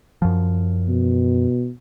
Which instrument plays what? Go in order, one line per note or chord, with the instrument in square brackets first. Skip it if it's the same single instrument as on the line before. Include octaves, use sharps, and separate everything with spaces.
[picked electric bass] F#2 F3
[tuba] B2